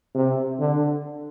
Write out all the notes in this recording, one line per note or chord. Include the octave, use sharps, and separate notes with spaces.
C3
D3